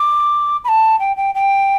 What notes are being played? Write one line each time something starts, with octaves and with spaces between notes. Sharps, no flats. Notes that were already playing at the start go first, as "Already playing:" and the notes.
Already playing: D6
B5
A5
G5
G5
G5